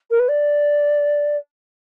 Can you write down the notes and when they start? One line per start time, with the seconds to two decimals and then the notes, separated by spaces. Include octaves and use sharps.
0.10 A#4
0.19 B4
0.28 D5